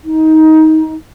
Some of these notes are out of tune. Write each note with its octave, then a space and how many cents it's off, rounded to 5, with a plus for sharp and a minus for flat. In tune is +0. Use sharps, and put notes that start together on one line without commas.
D#4 +20